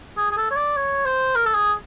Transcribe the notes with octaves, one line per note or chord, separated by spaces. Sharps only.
G#4
G#4
A4
C#5
D5
C#5
C5
A#4
A4
G#4